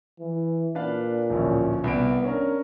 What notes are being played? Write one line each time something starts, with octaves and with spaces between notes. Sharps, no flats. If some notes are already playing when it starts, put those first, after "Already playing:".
E3
A#2 D4 B4 F5
D1 A#1 C#4
C2 B3 D5 D7
C#4 D4 A#4